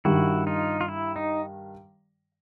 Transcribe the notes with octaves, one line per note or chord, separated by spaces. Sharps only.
G2 D#3 G3 E4 F#4
D#4 F4
F4
E4
D#4